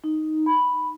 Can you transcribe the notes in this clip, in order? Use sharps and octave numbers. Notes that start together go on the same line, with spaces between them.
D#4
B5